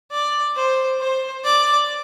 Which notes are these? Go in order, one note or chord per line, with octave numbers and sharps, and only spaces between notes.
D5
C5
C5
D5